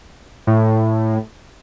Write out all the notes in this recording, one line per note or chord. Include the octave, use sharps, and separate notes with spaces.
A2